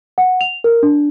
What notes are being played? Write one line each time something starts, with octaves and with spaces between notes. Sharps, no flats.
F#5
F7
A#4
D4